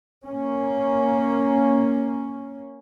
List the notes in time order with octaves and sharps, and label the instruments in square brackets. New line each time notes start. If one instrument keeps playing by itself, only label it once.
[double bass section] A#3 C#4